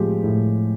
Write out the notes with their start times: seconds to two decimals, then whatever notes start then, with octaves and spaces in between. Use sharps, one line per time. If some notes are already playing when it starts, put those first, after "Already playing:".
Already playing: A2 F3 G#3 G4
0.24 A2